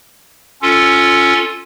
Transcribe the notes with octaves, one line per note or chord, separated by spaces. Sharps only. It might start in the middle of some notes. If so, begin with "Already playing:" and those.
C#4 F4 A4